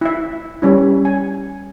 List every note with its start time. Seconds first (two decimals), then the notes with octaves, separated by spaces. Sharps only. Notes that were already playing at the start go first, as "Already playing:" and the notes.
0.01 E4 E5
0.62 G3 C#4 E4
1.05 G#5